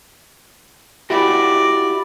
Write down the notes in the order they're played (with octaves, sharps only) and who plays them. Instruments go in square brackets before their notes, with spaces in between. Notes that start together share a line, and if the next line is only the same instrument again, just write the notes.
[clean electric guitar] E4 F#4 G4 [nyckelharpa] D5